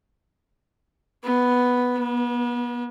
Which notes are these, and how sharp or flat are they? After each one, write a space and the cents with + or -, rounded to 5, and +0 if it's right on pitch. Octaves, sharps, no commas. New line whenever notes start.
B3 +0
B3 -35